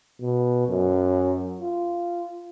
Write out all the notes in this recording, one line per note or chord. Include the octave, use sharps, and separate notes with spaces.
B2
F#2
F4